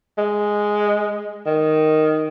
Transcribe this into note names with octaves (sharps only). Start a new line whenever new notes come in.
G#3
D#3